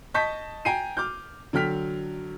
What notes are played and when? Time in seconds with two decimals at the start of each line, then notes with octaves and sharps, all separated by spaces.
0.14 D#5 A5 C#6 G6 B6
0.65 G5 G#5 A#5 C7 D#7
0.97 D6 F6 G6
1.53 D3 F#3 G5 F6 B6